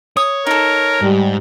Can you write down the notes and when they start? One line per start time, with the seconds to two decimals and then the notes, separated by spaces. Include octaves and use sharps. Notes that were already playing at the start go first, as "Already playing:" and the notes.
0.17 C#5 D#6
0.47 D#4 A4 A#4
1.02 G#2 G3